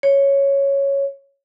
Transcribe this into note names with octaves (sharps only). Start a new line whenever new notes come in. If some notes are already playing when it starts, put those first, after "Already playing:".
C#5